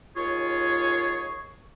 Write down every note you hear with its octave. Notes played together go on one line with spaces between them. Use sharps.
D#2 F4 G#4 C#5 C#6